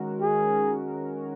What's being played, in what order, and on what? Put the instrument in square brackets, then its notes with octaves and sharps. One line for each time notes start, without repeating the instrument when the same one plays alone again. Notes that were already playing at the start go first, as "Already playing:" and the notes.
Already playing: [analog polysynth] D#3 G#3 C#4 F#4 A#4
[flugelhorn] G#4